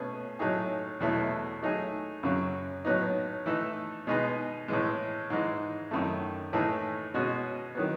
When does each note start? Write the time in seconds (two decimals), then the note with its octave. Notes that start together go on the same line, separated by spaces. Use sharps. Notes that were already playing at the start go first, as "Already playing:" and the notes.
Already playing: B2 A3 C#4 G#4 B4
0.39 A2 F#3 A3 D#4 G#4
1.00 E2 B2 F#3 A3 E4
1.62 F#3 A3 D#4 G#4
2.23 F#2 C#3 F#3
2.85 A2 F#3 B3 D#4
3.46 E3 A3 D#4 A4
4.07 B2 G#3 D#4 G#4 B4
4.68 A2 E3 G#3
5.30 G#2 E3 G#3
5.91 F#2 D#3 A3
6.53 A2 E3 A3 D#4 G#4
7.14 B2 G#3 C#4 F#4
7.75 D#3 F#3 B3